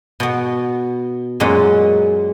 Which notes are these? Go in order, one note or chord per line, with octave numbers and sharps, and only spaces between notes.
B2 B3
F#2 A#2 G#3 C#4 B4